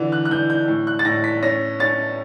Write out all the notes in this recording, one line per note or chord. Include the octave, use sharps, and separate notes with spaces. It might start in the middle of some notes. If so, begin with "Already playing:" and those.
Already playing: D3 E3
F#6
F#6
E3 G6
G6
A2
F#6
A6
A2 A#6
B6
C#4 A#6
C#4 A6